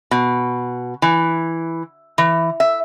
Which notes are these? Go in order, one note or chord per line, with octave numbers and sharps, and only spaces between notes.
B2
E3
E3
E5